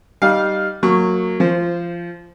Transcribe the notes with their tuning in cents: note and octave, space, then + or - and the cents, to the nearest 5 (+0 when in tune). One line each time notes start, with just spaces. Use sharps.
G3 -15 D#4 -5 F5 +0
F#3 -15 A#3 -25 C#6 +0
F3 -20 C5 +0